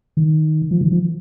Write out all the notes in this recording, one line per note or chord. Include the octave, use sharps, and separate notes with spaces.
D#3
F3
D#3
F3